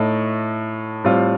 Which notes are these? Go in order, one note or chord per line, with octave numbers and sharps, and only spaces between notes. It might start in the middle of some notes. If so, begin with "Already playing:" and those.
Already playing: A2 A3 D#4
A2 G3 C4 F4